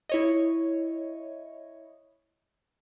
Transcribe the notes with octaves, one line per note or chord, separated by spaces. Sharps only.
E4 C#5 D#5